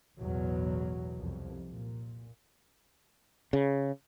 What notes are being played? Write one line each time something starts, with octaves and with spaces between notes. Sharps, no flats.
A1 E2 B2 F#3
C2 F2
A#2
C#3